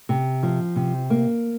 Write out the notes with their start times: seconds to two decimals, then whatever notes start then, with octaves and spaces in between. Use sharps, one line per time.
0.09 C3
0.43 F3
0.76 C3
1.10 A#3